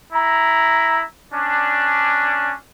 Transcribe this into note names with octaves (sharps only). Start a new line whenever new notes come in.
E4 A#5
C#4 D4